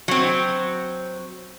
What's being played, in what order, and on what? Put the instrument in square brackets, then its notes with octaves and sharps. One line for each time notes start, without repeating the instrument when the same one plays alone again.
[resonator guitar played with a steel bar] F#3 C4